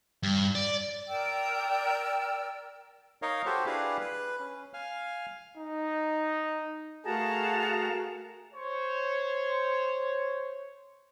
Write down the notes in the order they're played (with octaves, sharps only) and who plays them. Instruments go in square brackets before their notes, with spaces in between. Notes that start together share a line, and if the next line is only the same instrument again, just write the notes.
[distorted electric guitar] G2
D5
[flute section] A#4 D5 G5 E6
[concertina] D#4 A#4 C#5 D#5 F5
F#4 G4 A4 C5
D4 E4 G4 G#4 B4 F5
B4
C#4
F5 G#5 F6
[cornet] D#4
[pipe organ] A3 A#4 A#5 [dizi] F#4 [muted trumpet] G#4 [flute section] F5 F#5 A5
[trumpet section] C5 C#5